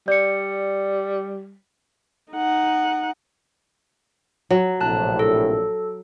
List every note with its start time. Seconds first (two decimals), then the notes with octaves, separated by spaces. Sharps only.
0.08 G3 D5 C#7
2.32 D#4 F#5
4.50 F#3
4.81 A#1 A2 C3 A5 F#6
5.19 A4